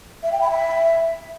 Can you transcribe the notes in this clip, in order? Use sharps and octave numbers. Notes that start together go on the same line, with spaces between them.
E5
G5
B5
E5